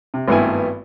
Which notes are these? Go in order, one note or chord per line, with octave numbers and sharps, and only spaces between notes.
C3
G#1 G2 A3 B3 E4 G#5